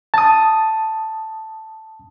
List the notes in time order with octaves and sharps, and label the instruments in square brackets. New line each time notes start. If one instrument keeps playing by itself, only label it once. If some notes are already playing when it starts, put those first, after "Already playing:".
[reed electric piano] A5 D#6